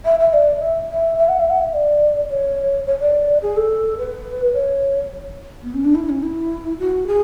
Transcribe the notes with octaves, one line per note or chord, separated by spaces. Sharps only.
E5
E5
D5
E5
E5
E5
F#5
E5
F#5
E5
D5
C#5
C#5
D5
G#4
A4
B4
C#5
B3
C#4
D4
E4
C#4
E4
F#4
G#4